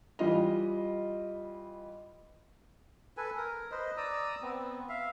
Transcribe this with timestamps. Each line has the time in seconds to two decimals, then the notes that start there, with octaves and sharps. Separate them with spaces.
0.19 E3 G3 F4 D#5
3.17 A4 B4 G#5
3.37 A#4
3.72 B4 C5 D#5
3.97 D5 A#5 D#6 E6
4.42 B3 C4
4.89 E5 F5